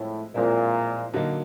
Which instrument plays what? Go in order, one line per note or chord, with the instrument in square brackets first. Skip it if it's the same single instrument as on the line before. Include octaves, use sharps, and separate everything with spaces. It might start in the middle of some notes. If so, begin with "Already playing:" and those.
Already playing: [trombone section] A2 [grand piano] F3 G#3 C4 E4
[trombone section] A#2 [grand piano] F3 G#3 C4 E4
[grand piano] D3 F#3 A#3 D#4